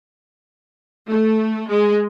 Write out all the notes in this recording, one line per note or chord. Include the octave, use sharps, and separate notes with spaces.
A3
G#3